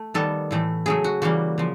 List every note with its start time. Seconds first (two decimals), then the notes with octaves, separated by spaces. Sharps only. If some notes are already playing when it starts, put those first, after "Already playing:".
Already playing: A3
0.14 D#3 G3 B3 A4
0.51 A2 E3 A3
0.86 C#3 F#3 A3 G#4
1.04 F#4
1.22 C#3 E3 G3 A#3 F#4
1.58 C#3 F3